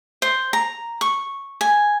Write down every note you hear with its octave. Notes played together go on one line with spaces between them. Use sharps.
C5
A#5
C#6
G#5